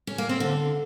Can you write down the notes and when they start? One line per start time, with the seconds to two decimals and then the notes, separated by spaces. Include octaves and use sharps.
0.07 C#4
0.18 A#3
0.29 C4
0.40 D3